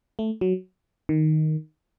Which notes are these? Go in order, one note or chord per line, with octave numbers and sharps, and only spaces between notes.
A3
F#3
D#3